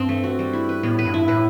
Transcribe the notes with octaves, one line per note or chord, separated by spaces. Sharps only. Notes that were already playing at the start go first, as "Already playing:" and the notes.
Already playing: G2 C4
A3
F#4
G3
E4
B4
A2 B3
B4
G2
E4
A2 B4